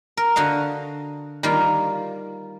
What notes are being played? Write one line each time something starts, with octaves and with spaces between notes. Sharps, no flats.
A#4
D3 F#4 D#5 F5
D#3 G3 A#3 F4